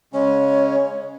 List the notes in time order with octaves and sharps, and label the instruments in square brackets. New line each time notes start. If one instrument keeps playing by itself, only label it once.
[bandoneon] C#3 G#3 C#4 [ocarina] C#5